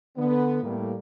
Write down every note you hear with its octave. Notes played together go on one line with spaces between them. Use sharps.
D3 B3
A2 G3 A#3